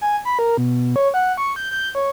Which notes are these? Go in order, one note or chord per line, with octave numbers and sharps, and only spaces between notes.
G#5
B5
A#4
B2
C#5
F#5
C#6
G6
G6
C#5